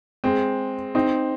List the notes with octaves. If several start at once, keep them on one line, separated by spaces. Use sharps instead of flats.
G#3 C4
C4 D#4